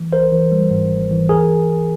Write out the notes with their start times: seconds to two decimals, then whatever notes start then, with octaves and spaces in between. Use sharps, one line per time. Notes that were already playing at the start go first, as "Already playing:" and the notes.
Already playing: E3
0.12 G#1 A#4 C5
0.32 E3
0.52 G3
0.70 G#2
0.91 G#1
1.11 E3
1.29 D#2 G#4 A#4